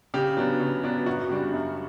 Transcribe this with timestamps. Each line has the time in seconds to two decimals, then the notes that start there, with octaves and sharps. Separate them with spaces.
0.14 C#3 G4
0.37 F#3 B3 D4
0.60 C#3
0.83 F#3 B3 D4
1.06 F#2 F#4
1.29 C#3 G3 D4
1.54 F#2